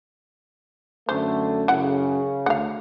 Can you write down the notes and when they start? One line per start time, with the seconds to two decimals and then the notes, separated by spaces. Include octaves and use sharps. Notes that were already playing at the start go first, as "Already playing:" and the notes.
1.09 F#2 D3 A3 C5
1.68 F#2 C#3 E4 F#5
2.46 D2 F5 F#5